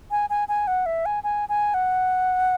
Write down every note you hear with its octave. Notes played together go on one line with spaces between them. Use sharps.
G#5
G#5
G#5
F#5
E5
G#5
G#5
G#5
F#5